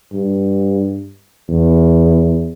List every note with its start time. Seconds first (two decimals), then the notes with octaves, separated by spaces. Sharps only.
0.12 G2
1.49 E2